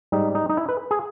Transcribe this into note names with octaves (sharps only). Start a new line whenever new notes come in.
G#2 G3 D#4
D#4
D#4
E4
B4
G#4